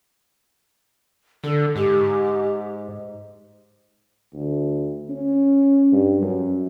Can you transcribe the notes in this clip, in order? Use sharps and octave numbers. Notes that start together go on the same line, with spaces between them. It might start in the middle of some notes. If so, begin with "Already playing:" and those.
D3 A4
G#2 G4
D2
C#4
G2
F#2